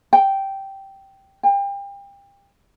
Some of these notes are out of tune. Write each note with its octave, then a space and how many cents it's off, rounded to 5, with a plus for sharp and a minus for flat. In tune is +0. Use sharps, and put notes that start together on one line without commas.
G5 -10
G5 +30